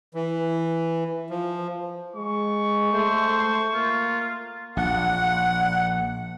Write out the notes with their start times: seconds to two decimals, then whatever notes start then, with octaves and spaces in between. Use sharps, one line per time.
0.14 E3
1.30 F3
2.16 G#3 C#6
2.94 A3 C5
3.74 A#3 F4
4.77 A#1 F#5